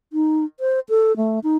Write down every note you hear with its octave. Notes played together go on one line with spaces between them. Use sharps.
D#4
C5
A4
A3
D#4